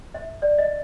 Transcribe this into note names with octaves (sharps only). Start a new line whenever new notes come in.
E5
D5
D#5